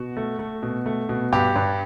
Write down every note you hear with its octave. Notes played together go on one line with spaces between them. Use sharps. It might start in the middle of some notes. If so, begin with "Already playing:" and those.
Already playing: B2 F#4
A3
A3
B2
A3
B2
G2 G4
G2